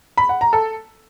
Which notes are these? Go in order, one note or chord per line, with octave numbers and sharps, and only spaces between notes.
B5
F#5
A#5
A4